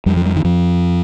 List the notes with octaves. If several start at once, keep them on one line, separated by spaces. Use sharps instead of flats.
F2 G3
F3
G3
D#3
F2 F3